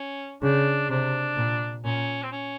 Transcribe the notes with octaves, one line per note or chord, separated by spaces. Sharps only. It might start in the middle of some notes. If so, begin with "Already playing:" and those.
Already playing: C#4
C#3 D4
C3 D4
A#2
A#2 C#4
C4
C#4